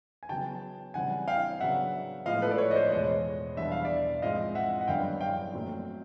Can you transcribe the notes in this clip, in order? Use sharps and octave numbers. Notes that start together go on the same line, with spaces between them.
G#5
C#3 F#3 B3 G5 A5
C#3 E3 G3 C4 F#5 G#5
F5 G5
C#3 F#3 B3 D4 E5 F#5
A2 F3 G#3 B3 D#5 F5
A4 B4
D5
B4 C#5
D#5
C5 D5
E2 B2 G#3 C#5 D#5
E2 B2 G3 B3 D4 E5
F5
D5 E5
G#2 F3 G#3 C4 D#5 F5
E5 F#5
F#5
F#2 D3 G3 B3 D4 F5 G5
F5 G5
A#2 F#3 A3 C4